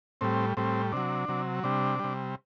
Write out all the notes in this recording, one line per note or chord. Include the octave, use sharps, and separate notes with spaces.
A2 G3 C4
A2 G3 C4
C3 F#3 D4
C3 F#3
C3 G3 D4
C3 G3